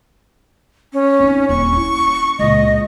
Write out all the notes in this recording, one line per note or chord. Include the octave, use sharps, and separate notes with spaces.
C#4
C4 D#4
D#1 C#6
C#4 E4
C#2 A#2 D#5